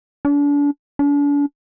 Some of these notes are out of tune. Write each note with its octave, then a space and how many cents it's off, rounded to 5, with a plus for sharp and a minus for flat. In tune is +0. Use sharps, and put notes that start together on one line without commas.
D4 -35
D4 -40